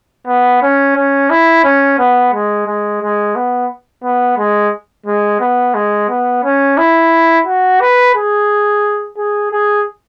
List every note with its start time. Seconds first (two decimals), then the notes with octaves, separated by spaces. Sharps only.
0.27 B3
0.62 C#4
0.96 C#4
1.30 E4
1.64 C#4
1.99 B3
2.33 G#3
2.67 G#3
3.01 G#3
3.36 B3
4.03 B3
4.38 G#3
5.06 G#3
5.40 B3
5.74 G#3
6.09 B3
6.44 C#4
6.78 E4
7.46 F#4
7.81 B4
8.15 G#4
9.17 G#4
9.51 G#4